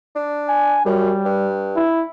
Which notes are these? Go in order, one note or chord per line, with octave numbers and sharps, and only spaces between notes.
D4
G#5
F#2 G3
G2
E4